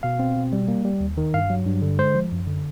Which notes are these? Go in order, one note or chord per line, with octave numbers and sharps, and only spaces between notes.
B2 F5
C4
B2
G3
A#3
G3
D#2
D#3
G2 F5
F#3
G2
D3
G#3 C5
F3
F#2
D3